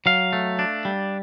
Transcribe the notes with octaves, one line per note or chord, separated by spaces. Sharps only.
F#3 F5
A3
D4
G3